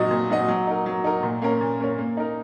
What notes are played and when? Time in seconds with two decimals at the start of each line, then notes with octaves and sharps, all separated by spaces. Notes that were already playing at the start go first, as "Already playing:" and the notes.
Already playing: A#2 F#3 D#4 F#4 D#5
0.11 A#2
0.30 F#3 D#4 F#4 D#5
0.48 F#3
0.67 D#4 A#4
0.86 F#3
1.04 D#4 A#4
1.23 A#2
1.42 A#3 C#4 A#4 C#5
1.61 A#2
1.80 A#3 C#4 A#4 C#5
1.98 A#3
2.17 D#4 A#4